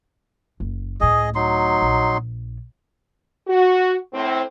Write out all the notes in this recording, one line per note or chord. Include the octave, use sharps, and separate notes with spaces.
F#1
C#2 A2 G#4 D#5
F#3 D#4 C6
A#1
F#4
A2 C4